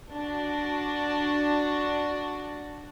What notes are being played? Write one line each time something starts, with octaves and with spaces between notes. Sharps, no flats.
D4 F#4